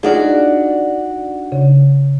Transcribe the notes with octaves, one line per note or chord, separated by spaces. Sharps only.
D4 D#4 F4 F#4 G#4 D5
C#3